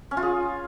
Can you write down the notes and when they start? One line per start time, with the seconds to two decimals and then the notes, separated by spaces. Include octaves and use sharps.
0.11 C#4
0.17 F4
0.23 G#4